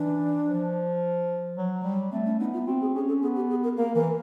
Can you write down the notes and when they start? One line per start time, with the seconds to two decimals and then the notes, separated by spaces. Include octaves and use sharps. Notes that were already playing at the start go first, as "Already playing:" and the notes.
Already playing: E3 D4
0.46 F3
1.58 F#3
1.84 G3
2.12 A3 C4
2.26 C#4
2.39 B3 D#4
2.53 F4
2.67 C4 F#4
2.82 G#4
2.94 C#4 G#4
3.08 A4
3.22 B3 G#4
3.36 G4
3.50 G#4
3.64 A#4
3.77 A#3 A#4
3.95 E3 A#4